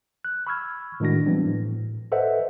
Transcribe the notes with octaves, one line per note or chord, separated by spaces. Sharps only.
F#6
B5 C#6 E6 F6 G#6
A2 D#3 G#3 D4 F#4 A#6
E3 F3 G3 B3 C4 D4
A2
A4 B4 C5 D#5 E5 F#5